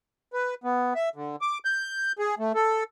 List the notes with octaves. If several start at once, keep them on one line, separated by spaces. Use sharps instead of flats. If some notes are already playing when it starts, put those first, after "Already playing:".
B4
B3
E5
D3
D6
G6
G#4
A3
A4